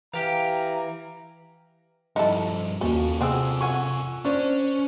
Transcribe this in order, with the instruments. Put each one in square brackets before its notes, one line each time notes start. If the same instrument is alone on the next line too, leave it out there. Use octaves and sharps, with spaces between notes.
[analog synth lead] E3 [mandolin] G4 F5 [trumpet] A#5
[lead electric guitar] G2 F3 [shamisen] D#4 E4 A4
[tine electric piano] D#2 A#3 F#4 [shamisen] C#4 [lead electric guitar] F4 A4
[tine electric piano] C3 E6 [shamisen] B3 C4 G#4
[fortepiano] F#5 G#5 C#6
[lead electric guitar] C#4 [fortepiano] D4 [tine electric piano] C5 C#6